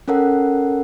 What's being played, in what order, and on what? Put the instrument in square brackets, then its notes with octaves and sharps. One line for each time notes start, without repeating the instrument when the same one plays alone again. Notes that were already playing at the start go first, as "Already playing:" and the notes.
[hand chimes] C#4 A4 A#4 F#5